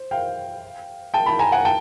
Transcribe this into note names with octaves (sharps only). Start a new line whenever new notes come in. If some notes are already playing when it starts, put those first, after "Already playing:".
Already playing: C5
F5 G5
G5 A5
A5 B5
G#5 A#5
F#5 G#5
G5 A5